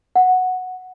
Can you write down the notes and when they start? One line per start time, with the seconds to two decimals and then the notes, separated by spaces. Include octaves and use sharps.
0.16 F#5